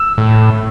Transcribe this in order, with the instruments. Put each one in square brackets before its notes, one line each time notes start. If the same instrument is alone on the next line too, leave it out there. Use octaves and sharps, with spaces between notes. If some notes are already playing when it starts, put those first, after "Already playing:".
Already playing: [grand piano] E6
[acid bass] A2